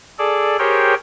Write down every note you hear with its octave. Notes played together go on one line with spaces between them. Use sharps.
G#4 A4 D5
G4 G#4 A#4 C5 C#5 G5